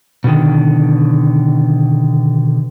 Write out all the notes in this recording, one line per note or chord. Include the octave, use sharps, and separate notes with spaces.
B2 D3 D#3